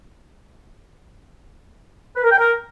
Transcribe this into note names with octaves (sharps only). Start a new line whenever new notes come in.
B4
A#4
G5
A#4